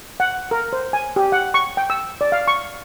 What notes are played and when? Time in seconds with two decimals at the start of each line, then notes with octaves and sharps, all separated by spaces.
0.20 F#5
0.51 A#4
0.73 C5
0.93 G#5
1.16 G4
1.32 F#5
1.54 C#6
1.77 G5
1.90 E6
2.21 D5
2.32 F5
2.48 C#6